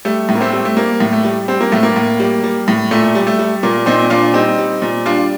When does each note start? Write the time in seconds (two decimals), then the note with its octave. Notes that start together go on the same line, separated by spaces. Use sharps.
0.05 G3 A3
0.29 A2
0.35 A#3
0.41 A3 C4
0.53 G3
0.65 A3
0.77 G3 A#3
1.00 A2
1.13 A3
1.24 G3
1.48 G3 C4
1.61 A#3
1.72 A2 A3
1.83 A#3
1.96 A2
2.20 G3
2.44 G3
2.68 A2
2.91 A#2 A3
3.15 G3
3.27 A3
3.39 G3
3.63 A#2 A#3
3.86 A#2 C4 D#4
4.10 A#2 D4 F4
4.34 G3 C4 D#4
4.58 G3
4.82 A#2
5.06 G3 D4 F4